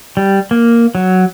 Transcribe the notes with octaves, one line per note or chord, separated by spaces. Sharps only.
G3
A#3
F#3